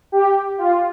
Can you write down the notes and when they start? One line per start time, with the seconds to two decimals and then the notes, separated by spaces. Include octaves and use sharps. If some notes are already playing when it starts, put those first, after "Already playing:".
0.12 G4
0.58 F4